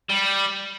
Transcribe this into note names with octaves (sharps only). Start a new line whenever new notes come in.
G3